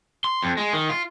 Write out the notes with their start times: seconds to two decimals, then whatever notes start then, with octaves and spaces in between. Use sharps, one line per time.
0.24 C6
0.43 F2
0.57 G#3
0.73 D#3
0.89 F4